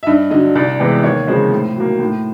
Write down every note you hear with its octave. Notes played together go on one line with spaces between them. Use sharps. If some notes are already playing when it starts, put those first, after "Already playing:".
E5
G2 D#5
D3 F#3 D#5
C2 D5
C3 E3 G#3 B3
D#2 C#5
C#3 F3 G#3 C4 C5
A2
F#3 A#3
A2